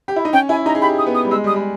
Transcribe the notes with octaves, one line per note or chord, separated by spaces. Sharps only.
G4
E4
D#4
C#4 G5
E4 G#5
D#4 A#5
G#4
G4 B5
D#6
B3
D#6
G3
G#3 E6
G3 D#6
G#3